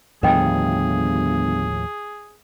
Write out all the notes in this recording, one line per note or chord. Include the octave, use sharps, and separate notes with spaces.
G1 D#2 A2 F3 G#4 B4 D#5 G5